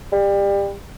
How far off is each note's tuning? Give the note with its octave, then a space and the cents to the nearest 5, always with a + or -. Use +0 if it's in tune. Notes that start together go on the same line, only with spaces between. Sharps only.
G3 +25